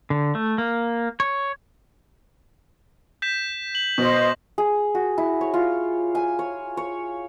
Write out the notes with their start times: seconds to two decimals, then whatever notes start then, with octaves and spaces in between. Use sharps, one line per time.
0.10 D3
0.35 A3
0.58 A#3
1.20 C#5
3.22 G6 B6 E7
3.75 F#7
3.98 B2 C5 D#5
4.58 G#4
4.95 F#4
5.18 E4
5.41 C#5
5.54 F4
6.15 G#5
6.39 C#5
6.77 C#5